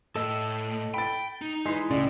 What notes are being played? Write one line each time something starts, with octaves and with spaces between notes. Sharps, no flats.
A2 A4 D#5 E6
G5 B5 A6
D#4
E3 G#3 E5 C6 C7
C#2 A2 D5